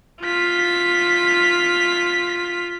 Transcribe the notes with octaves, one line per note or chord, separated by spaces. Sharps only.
F4 B6